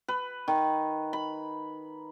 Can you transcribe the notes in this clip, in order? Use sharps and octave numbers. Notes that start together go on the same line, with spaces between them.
B4
D#3
B5